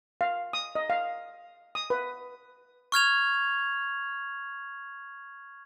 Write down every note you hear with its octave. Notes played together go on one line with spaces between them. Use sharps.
F5
D#6
D#5
F5
D#6
B4
C#6 F6 G#6 F7